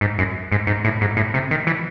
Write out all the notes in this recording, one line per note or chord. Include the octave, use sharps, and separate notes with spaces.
G#2
F#2
G#2
G#2
A2
G#2
A2
C3
D#3
E3